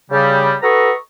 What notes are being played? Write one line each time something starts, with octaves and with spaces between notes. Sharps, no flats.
C#3 G3
F#4 A4 B4 D#5 A#5 C#6